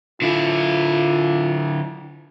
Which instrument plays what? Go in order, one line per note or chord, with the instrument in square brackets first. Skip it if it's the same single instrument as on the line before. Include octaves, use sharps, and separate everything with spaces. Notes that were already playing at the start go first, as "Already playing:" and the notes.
[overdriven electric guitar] D3 E4 [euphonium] F4